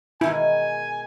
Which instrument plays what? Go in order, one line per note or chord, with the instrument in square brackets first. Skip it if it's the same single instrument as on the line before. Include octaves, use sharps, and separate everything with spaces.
[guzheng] B2 D#3 G#3 [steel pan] E4 [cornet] G#5